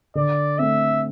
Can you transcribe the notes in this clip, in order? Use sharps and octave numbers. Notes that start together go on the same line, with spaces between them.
D3 D5
A3 C4 E5